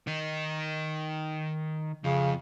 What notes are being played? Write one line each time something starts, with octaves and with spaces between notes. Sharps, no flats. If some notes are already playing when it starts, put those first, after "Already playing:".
D#3 D#4
F2 C#3 F3